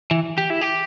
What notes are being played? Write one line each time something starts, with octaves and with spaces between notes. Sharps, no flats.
E3
G4
E4
G4